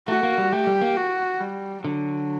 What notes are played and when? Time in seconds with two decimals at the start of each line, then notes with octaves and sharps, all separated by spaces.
0.08 A3 F#4
0.23 A#3
0.38 G3
0.52 A3 G4
0.67 G3
0.81 A#3
0.96 F#4
1.40 G3
1.84 D3 F#3